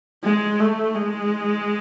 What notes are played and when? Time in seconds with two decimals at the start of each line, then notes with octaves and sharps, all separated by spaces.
0.24 G#3
0.59 A3
0.94 G#3